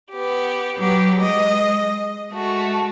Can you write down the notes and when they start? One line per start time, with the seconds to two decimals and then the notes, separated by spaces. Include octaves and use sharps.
0.12 B3 G4
0.78 F#3 B3 G4
1.21 G#3 D#5
2.32 G#3 A3 F#4